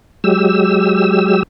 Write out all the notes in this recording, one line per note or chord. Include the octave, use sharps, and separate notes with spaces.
F#3 G#3 G4 E6